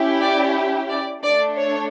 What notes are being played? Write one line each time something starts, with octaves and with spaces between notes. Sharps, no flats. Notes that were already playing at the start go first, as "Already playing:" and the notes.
Already playing: C#4 E4 G4
D5
D5
A3 D4 A4 D5
C#5